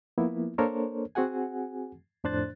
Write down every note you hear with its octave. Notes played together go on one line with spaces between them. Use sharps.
F3 A#3 B3 E4
A#3 D4 A4 A#4 C5 C#5
C4 F#4 G#4 F#5 G#5
F2 A2 D4 C5 F#6 A6